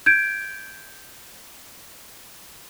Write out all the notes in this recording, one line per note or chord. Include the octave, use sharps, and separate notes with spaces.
G6 G#6 D7